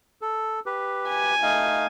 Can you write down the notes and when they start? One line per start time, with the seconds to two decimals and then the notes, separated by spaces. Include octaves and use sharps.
0.21 A4
0.66 G4 B4
1.09 G#5
1.42 A3 D#4 F5